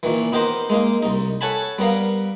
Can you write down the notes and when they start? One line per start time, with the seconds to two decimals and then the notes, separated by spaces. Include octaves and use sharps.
0.03 A#2 D#3 E3
0.32 B3 D#4 G4 A#4 C5
0.70 G#3 A#3 D#4
1.03 C2 D#4
1.41 A4 C#5 F#5 G#5 A5 B5
1.78 G3 B3 A#4 F5